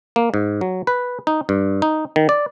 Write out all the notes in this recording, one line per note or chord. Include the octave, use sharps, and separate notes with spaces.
A#3
G#2
F#3
B4
D#4
G2
D#4
D#3
D5